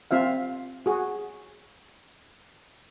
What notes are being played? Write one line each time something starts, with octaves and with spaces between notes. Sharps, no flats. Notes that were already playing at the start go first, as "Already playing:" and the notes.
C4 F4 E5 F5
F#4 G#4